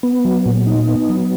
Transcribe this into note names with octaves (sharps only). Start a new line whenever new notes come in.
B3
F#3
A#2
D#4
B3
F#3